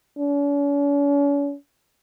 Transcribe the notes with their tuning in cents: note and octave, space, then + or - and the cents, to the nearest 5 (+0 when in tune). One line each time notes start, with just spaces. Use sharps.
C#4 +45